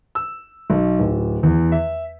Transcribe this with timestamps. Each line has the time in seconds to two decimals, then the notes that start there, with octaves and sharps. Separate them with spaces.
0.15 E6
0.70 B1
0.99 D1
1.43 E2
1.72 E5